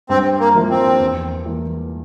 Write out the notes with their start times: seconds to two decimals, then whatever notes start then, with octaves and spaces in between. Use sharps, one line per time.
0.09 G2 C4
0.40 A#3
0.55 F3 A#3 E4 A#4
0.70 C4
1.00 E2
1.46 E3 A#3